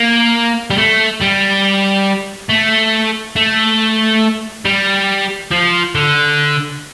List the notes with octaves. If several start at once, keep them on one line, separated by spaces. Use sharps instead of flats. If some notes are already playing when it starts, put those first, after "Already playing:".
Already playing: A#3
G3
A3
G3
A3
A3
G3
F3
D3